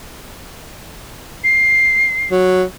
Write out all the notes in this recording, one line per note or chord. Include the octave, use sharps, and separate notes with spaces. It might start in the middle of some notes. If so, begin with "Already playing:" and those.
C7
F#3